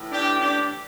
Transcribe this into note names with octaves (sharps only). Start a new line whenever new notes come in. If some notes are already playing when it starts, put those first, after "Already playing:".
Already playing: A2 E3
D4 G4
D4 G4